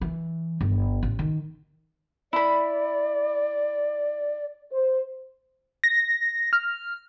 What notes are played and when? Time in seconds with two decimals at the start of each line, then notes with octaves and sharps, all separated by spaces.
0.01 E3
0.61 G1
1.03 A1
1.19 D#3
2.33 E4 D5 B5
4.72 C5
5.84 A#6
6.53 F6